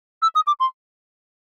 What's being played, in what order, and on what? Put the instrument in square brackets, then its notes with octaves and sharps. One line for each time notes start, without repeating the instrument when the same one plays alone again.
[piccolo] E6
D#6
D6
C6